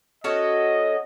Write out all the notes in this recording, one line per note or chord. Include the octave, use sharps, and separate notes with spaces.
C#4 F#4 A4 D#5